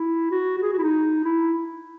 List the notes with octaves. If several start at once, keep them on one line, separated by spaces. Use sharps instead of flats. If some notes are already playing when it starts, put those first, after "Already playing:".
Already playing: E4
F#4
F#4
G#4
F#4
E4
D#4
E4